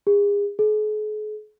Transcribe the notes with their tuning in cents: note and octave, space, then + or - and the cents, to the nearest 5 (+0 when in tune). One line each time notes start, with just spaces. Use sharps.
G#4 -35
G#4 +45